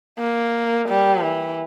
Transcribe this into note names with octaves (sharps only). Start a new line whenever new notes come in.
A#3
G3
E3